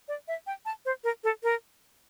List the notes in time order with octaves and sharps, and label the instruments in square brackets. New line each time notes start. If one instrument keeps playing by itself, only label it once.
[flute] D5
E5
G5
A5
C5
A#4
A4
A#4